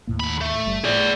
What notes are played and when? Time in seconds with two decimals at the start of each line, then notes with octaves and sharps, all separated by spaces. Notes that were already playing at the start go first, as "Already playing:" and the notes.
0.07 D#2 A2 A#3
0.20 D3 B5
0.41 A3
0.66 F#1 G3
0.84 A2 G#4 D5